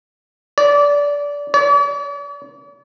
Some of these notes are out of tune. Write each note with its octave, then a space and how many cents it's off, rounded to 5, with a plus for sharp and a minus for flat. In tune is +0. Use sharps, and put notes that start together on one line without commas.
D5 -20
D5 -45